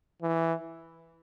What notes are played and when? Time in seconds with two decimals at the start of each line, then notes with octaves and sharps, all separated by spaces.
0.22 E3